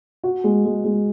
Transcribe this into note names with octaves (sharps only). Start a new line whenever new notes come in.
F#4
G#3
G#3
G#3